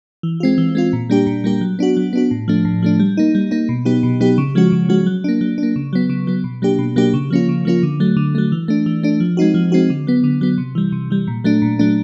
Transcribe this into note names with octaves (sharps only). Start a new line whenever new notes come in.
E3
G#3 C4 F4
E3
G#3 C4 F4
A#2
G3 A#3 D4 G4
A#2
G3 A#3 D4 G4
F#3
B3 D4 F#4
F#3
B3 D4 F#4
A2
F3 A3 D4
A2
F3 A3 D4
G3
A#3 D#4
G3
A#3 D#4
B2
F#3 B3 D#4 G4
B2
F#3 B3 D#4 G4
C#3
F3 G#3 C#4 F#4
C#3
F3 G#3 C#4 F#4
F#3
A#3 D4
F#3
D4
A#3
C#3
F#3 B3
C#3
F#3 B3
B2
F#3 A#3 D4 G4
B2
F#3 A#3 D4 G4
C#3
F3 A#3 C#4 F4
C#3
F3 A#3 C#4 F4
D3
F#3 A3
D3
F#3 A3
E3
A3 D4
E3
A3 D4
F3
G#3 C4 D#4 F#4
F3
G#3 C4 D#4 F#4
D3
F#3 B3
D3
F#3 B3
C3
E3 G3
C3
E3 G3
A#2
F#3 A3 D4
A#2
F#3 A3 D4